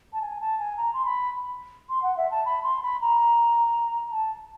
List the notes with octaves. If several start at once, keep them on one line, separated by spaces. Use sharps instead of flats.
A5
G#5
A5
G#5
A#5
C6
B5
C6
F#5
E5
A5
B5
C6
B5
A#5
A5